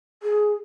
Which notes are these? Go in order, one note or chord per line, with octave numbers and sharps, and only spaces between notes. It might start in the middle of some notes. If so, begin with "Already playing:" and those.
G#4